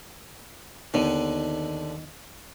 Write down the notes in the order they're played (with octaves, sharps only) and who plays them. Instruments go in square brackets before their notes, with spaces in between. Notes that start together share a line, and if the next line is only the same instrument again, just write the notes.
[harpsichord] D#2 D3 [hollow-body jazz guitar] D#3 B3 D#4